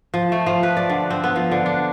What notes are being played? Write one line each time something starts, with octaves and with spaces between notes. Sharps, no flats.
F3
A3
F3
B4
D5
D3
C4
B3
F3
D3
D4